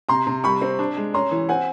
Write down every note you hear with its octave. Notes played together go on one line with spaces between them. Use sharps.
C3 A#5 C6
C3
G3 B5 C#6
C4
D4
G#3
C#4 A#5 C6
E3
C4 F#5 G#5